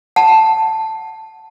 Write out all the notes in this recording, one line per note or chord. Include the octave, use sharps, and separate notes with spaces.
F#5 A5